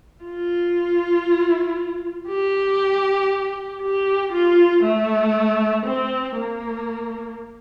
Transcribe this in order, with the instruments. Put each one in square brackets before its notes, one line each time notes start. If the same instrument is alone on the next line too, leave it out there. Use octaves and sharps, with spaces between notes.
[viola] F4
G4
G4
F4
A3
C4
A#3